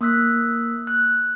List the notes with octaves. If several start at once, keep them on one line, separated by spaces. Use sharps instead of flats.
A#3 D#6 E6 F#6 B6
F#6